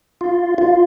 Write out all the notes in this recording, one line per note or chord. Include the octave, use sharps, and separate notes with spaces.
F4
F4